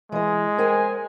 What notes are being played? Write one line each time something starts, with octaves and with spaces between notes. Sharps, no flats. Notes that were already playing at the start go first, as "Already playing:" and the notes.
E3 G#3 D#5
A#4 C5 G5 G#5